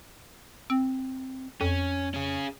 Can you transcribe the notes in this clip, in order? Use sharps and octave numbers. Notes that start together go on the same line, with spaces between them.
C4
F2 C#4
C#4 G#4